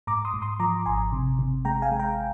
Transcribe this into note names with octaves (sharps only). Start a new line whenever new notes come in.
G#2 A#5 D6
C6 D#6
G#2
C6 D#6
F3 A#5 D6
G#1 G#5 C6
C3
C3
G#3 G5 A#5
F5 G#5
G#3
G5 A#5